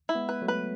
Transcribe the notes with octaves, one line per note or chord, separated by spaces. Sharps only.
E4
G#3 B3
B4
F#3 A3
B4